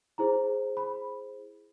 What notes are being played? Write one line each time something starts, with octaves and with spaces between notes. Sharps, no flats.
E4 G#4 C5 A#5
B5